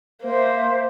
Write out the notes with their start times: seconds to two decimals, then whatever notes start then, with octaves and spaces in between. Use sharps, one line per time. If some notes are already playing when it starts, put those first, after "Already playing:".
0.23 A#3 C5 E5